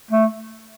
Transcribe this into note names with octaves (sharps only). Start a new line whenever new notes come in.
A3